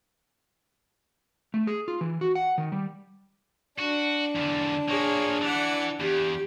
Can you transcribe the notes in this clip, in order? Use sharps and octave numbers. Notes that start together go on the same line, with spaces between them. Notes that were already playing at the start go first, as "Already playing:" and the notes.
A3
G#4
F4
E3
F#4
F#5
D#3
G3
D4 F#4
E2 D3
F3 A#3 G#4 C#5
E3 D5 F#5
E2 G4